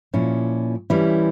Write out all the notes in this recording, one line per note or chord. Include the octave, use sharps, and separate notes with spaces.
A#2 F3 C#4 E4
E3 G3 C#4 E4